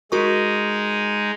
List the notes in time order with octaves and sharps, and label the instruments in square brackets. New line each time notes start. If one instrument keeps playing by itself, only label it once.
[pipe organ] G#3 D#4 [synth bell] F#4 A#4 C#6